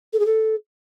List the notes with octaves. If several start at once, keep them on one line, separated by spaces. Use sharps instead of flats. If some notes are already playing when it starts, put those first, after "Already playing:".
A4
G#4
A4